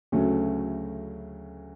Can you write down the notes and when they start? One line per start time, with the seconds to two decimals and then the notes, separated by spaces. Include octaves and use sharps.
0.12 D2 C#3 F#3 A3 C#4